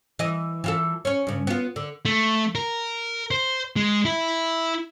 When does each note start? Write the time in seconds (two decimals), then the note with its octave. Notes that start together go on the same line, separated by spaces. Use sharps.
0.19 E3 D#5
0.64 E3 F4 A4
1.05 C#4 C#5
1.27 G2 C#3
1.47 B3 F4
1.76 D3
2.05 A3
2.55 A#4
3.31 C5
3.76 G#3
4.05 E4